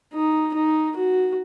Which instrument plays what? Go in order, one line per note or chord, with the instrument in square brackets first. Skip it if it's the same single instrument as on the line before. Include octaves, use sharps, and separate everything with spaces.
[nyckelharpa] D#4
D#4
F#4